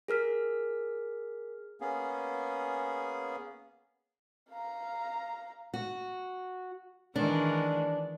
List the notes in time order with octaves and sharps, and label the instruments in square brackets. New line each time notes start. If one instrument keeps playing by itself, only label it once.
[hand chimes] G#4 A#4 F6 B6
[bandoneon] A#3 B3 C#4 G#4
[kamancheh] F5 A#5
[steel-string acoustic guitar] F#4
[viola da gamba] D#3 E3 G#3 [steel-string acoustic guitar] D4